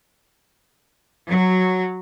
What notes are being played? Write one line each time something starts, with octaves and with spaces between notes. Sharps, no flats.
F#3